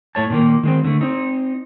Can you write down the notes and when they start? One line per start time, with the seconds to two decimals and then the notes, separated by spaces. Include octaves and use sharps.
0.15 A2 A3 C#5 A5
0.30 A#2 D#3 A#3
0.63 D#3 G#3 C4
0.84 D3 A3
1.01 C4 D#4